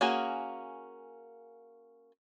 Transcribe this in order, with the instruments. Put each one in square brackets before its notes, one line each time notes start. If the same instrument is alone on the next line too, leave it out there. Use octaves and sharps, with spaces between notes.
[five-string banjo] A#3 C#4 F#4 G#4